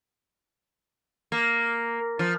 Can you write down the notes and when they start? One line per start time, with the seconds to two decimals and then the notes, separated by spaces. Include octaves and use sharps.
1.32 A#3
2.19 F3